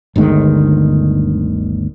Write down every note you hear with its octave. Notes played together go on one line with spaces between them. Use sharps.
G1 D2 D#3 G#3